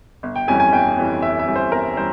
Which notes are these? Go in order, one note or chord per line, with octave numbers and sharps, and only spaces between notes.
G1
G5
F2 E3 G3 C#4 G#5
G#5
G1 G5
F2 E3 G3 C#4
G1 E5
E5
F2 E3 G3 C#4
C5
G1 A#4
E3 G3 C#4 C5